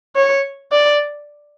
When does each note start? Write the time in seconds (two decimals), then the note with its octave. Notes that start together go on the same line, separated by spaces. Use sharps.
0.16 C#5
0.72 D5